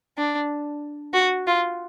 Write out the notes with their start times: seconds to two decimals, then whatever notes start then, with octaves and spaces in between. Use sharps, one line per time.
0.18 D4
1.14 F#4
1.47 F4